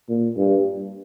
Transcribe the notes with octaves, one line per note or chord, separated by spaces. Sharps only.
A#2
G2